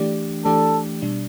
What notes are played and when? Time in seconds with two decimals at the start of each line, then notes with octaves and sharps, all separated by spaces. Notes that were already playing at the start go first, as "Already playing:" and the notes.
Already playing: E3 A3 D4 G4 D5
0.45 E3 A3 D4 G4 A4 D5
1.02 B2 G3 D4